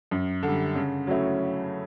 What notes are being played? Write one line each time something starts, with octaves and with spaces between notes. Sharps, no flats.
F#2
D3 G3
C#3
F#3 A3 C#4 E4